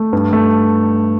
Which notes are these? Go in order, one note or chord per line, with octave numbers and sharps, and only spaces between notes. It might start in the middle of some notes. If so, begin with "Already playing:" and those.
Already playing: A3
G2
A3